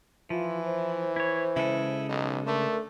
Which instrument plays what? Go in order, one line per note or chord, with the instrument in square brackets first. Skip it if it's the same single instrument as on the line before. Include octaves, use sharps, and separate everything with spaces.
[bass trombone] E3 [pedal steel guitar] F3 [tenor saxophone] E4 [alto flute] F4
[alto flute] C5
[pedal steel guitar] E4 C#5
[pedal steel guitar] C#3 G#3 A4 [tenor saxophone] E4
[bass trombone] B1 [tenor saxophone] D#4
[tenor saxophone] D3 [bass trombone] A3 [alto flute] A#4